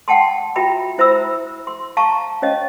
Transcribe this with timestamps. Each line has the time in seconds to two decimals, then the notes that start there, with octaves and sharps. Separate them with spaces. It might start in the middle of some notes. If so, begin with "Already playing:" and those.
0.08 F#5 G5 A5 C6
0.56 F4 F#4 E5 G5 A#5 B5
0.98 E4 C5 E5 A#5 B5 E6
1.67 C6
1.97 F5 A5 A#5 C#6
2.42 C#4 C#5 D#5 F5